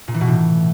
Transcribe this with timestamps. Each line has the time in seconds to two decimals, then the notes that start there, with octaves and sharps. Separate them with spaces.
0.08 A#2
0.14 E3
0.21 B2
0.27 A2